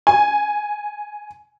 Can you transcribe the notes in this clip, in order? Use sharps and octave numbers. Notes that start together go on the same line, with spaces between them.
G#5